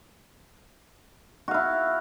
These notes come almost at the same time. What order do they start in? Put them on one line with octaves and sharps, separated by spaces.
F#4 F5 E4